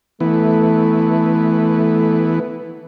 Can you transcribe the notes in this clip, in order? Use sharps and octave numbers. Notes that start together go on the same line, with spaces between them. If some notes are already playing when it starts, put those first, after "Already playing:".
E3 A3 B3